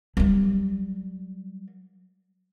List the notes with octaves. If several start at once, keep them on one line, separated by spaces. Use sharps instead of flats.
F#3 G3